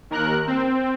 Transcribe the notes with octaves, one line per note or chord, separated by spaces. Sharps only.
D#2 A#4 F#6
C4